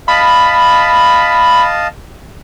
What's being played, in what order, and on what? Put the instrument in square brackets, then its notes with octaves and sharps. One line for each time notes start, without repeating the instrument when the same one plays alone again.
[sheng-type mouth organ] D#5 F5 A5 [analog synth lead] B5